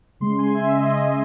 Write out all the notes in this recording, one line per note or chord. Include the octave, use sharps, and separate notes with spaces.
C#3 G#3 C6
G#5
E5
D#5
D#5